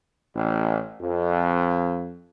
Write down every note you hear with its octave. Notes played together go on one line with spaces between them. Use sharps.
A1
F2